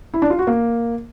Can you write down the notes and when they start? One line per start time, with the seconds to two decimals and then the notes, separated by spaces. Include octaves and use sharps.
0.14 E4
0.22 D4
0.30 F4
0.39 F#4
0.47 A#3